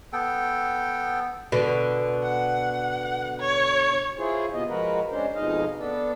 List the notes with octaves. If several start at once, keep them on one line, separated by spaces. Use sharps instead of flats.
B3 A4 G5
B2 D3
F#5
C#5
E4 F4 G#4 C5 C#5
C3 B3 F4 D#5
F3 G#3 F#4 A#4 B4
G#3 C#4 D4 C5
F2 B2 G#3 D#4 D#5 F5
B3 D4 A4